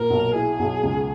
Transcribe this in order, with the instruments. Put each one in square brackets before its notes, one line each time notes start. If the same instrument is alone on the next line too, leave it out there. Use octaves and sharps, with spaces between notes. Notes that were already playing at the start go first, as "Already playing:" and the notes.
Already playing: [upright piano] A#2 [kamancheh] A#4
[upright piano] B1
[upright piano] E4 [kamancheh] G#4
[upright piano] B1
C#2